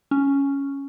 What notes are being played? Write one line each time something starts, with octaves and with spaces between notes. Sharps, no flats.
C#4